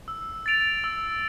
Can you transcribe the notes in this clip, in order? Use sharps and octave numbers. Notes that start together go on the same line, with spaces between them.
E6
A6 D7 F7
E6